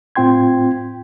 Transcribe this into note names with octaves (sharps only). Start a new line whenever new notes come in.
A2 C4 F4 G5 C6 G#6